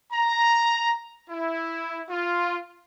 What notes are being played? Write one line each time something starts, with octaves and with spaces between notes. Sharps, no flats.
A#5
E4
F4